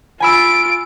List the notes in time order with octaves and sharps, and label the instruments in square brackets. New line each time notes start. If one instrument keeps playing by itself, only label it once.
[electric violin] F4 D7 [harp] G#5 B5 E6